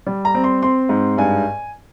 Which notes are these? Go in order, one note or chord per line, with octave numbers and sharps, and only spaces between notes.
G3
A#5
C4
C6
C4 C6
G#2
G2 G#5